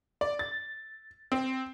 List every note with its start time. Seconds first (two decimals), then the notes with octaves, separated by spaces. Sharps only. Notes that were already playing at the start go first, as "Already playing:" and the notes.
0.21 D5
0.39 A6
1.32 C4